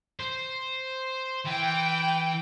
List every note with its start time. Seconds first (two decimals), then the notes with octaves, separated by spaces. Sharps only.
0.20 C5
1.46 E3 G5